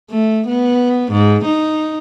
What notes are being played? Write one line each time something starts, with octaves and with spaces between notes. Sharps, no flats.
A3
B3
G#2
D#4